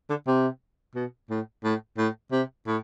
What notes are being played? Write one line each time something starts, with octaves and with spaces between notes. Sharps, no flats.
D3
C3
B2
A2
A2
A2
C3
A2